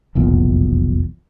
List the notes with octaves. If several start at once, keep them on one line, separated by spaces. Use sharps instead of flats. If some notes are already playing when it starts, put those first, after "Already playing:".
F1 B1 E2 A#2